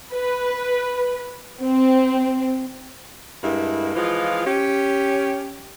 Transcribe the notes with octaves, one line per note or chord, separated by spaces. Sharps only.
B4
C4
G2 G#3 A#3 E4
E3 F3 G#3 F4
C#4 G4